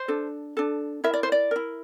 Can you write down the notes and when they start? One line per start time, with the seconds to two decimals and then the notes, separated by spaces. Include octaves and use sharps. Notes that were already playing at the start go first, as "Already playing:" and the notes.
Already playing: C5
0.08 D4 A4
0.57 D4 A4
1.04 E4 A#4 E5
1.14 D5
1.23 C5
1.32 D5
1.51 E4 A#4